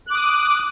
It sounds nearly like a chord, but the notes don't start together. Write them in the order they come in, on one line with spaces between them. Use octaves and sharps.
F#6 D6 D#6